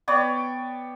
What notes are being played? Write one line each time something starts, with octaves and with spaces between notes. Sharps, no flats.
B3 C#5 D5 G5